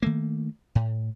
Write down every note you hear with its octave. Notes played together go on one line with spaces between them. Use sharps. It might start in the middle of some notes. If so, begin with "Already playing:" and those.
D#3 A3 A#3
A2